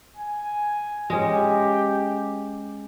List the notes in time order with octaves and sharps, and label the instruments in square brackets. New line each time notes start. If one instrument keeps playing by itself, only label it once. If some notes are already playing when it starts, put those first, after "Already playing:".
[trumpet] G#5
[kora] G#3 C#4 [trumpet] G4